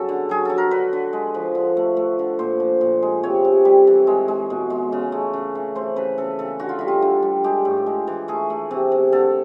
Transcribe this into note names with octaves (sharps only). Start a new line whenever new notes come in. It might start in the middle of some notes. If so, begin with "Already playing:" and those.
Already playing: C#3 F#3 A4
D3
F#3 G#4
F#3 A4
A#4
D3 B4
D3
G#3
F3
D3
A3
A3
D3
A#2 C5
F3
A#2
G#3
C3 C#5
C3
G3
E3
G#3
G#3
B2
G#3
C#3
A3
C#3
E3
A3 C5
C#3 B4
C#3 A4
C#3 A4
D3 F#4
F4
G3 E4
F4
D3
G3
G#3 G4
A2
G#3
E3
A3 G#4
A3
C3
C3
D3 A4